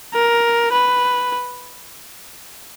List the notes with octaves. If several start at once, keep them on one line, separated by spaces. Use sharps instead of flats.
A#4
B4